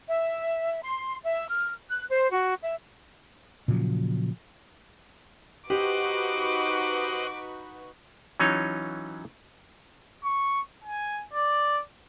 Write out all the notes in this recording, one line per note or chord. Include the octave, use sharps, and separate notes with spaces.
E5
C6
E5
F6
F#6
C5
F#4
E5
A#2 C#3 F3 F#3
D#4 F#4 G4 B4 C5 D#5 F#5 D6
E3 F#3 C#4 D#4 F4 C#5
C#6
G#5
D5